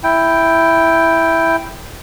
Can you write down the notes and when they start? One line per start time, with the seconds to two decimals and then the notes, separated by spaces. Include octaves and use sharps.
0.03 E4 G5